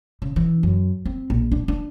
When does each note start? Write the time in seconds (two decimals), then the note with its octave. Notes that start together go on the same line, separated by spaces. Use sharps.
0.22 C#3
0.36 E3
0.63 F#2
1.05 C4
1.30 A#1
1.52 D4
1.68 D4